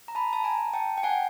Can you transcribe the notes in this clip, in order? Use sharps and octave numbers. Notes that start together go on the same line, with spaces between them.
A#5
A5 B5
A5
G#5 A#5
G5 A5
G5
F#5 G#5